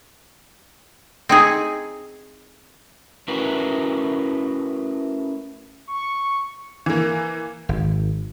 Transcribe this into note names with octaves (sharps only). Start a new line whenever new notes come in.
C4 D#4 G#4
A3 C#4 E4 F#4 A#4 B4
C#6
E3 A#3
G#1